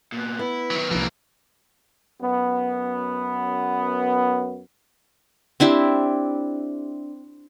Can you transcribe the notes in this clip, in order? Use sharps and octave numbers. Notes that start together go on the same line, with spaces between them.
A#2 B3
B3 E4
D#3 F#3
C2 A#2 E3 F3 A#3 A4
F#2 B3
C4 D4 E4 G4